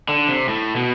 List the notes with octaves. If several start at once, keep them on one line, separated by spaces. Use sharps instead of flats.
D3
C3
A2
B2